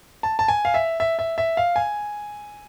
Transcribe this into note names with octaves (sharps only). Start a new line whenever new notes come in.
A5
A5
G#5
F5
E5
E5
E5
E5
F5
G#5